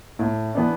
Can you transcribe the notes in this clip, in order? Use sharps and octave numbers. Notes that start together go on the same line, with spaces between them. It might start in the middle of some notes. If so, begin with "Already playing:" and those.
A2
E3 B3 D4